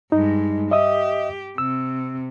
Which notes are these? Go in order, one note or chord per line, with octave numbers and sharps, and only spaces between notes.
G2 G#3 D#4
G4 D#5 E5 D#6
C3 E6